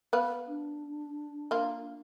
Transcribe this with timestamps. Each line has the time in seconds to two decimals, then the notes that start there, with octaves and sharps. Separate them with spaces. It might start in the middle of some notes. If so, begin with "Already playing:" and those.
0.13 B3 B4 F5
0.48 D4
1.51 A#3 F4